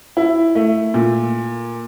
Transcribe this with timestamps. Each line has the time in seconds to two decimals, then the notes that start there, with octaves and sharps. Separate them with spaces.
0.17 E4
0.55 A3
0.94 A#2